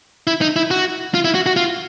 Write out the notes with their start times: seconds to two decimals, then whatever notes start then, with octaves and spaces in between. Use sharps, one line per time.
0.27 E4
0.41 D#4
0.56 E4
0.71 F#4
1.14 F4
1.25 E4
1.35 F#4
1.46 F#4
1.56 F4